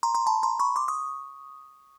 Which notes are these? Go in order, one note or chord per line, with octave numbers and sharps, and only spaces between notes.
A#5 C6
A#5 C6
A5 B5
A#5 C6
B5 C#6
C6 D6
C#6 D#6